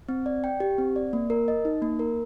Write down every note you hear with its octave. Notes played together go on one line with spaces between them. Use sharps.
C4
D5
G5
G4
C4
D5
A#3
A#4
D#5
D#4
A#3
A#4